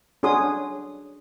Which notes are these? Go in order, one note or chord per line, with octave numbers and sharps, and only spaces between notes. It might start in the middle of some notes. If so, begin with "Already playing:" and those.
C#4 D4 F#4 G#4 C6 D#6